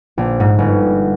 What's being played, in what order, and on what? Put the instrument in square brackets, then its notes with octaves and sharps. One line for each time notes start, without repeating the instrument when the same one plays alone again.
[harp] A#1
G#2
G1